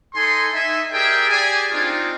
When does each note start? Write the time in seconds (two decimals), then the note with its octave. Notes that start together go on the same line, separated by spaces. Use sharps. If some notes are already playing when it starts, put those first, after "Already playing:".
0.15 D#4 A4 G#5 C6
0.53 D#4 E5 G#5
0.92 G4 G#4 A#4 D5 E5 G5
1.29 G4 G#4 D5 G#5
1.71 C4 D4 D#4 F4